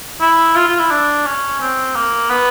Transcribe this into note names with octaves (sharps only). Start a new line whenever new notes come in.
E4
F4
F4
E4
D4
C#4
C4
A#3
B3